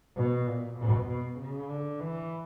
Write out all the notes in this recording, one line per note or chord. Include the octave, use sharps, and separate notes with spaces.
B2
A#2
B2
B2
C#3
D3
E3